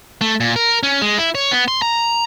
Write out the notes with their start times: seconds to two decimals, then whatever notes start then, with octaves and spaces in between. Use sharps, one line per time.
0.21 A3
0.40 A#2
0.56 A#4
0.83 C#4
1.02 G#3
1.18 E4
1.35 C#5
1.52 B3
1.68 C6
1.82 A#5